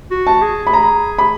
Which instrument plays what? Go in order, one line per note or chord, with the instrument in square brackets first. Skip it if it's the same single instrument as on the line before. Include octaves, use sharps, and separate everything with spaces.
[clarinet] F#4
[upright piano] A5
[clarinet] G#4
[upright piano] B5
A#5
B5